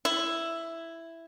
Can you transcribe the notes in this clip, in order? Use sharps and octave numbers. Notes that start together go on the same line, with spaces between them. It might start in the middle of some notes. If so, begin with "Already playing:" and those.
E4